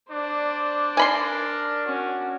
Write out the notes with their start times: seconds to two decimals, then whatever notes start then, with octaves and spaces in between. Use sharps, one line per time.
0.11 D4 C5 D5
0.97 A#4 G#5 B5 C6
1.85 C#4 F#4